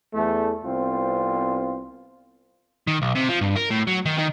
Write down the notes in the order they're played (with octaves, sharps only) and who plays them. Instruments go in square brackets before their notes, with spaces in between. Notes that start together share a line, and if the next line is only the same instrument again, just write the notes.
[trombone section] E2 A3
C2 B3 C4 F4
[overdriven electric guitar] D#3
B1
C3
F3
G2
A#4
A2
F#3
D#3
D#3